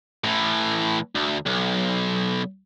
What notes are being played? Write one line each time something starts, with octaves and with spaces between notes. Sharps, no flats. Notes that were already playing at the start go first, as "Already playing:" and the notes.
A2 E3
D2
B1